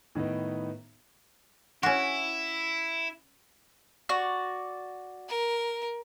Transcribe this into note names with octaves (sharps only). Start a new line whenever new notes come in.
A2 D#3 B3 D#4
C#4 E4 F#4
F#4 D5
A#4